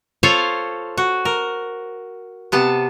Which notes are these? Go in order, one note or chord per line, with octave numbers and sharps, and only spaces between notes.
F4 A4 C5 C#5 F5
F#4
A#4
C3 B3 A5